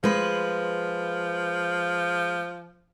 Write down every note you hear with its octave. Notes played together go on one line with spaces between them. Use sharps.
F3 G#3 B4